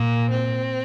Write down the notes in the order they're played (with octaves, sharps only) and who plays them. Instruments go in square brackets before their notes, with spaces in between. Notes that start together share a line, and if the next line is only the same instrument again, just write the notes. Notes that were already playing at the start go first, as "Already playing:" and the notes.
Already playing: [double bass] A#2 [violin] A#3
[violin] C4